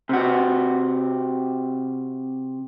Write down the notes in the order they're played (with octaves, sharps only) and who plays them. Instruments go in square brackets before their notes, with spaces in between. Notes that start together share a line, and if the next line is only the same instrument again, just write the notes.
[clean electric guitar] C3 F#4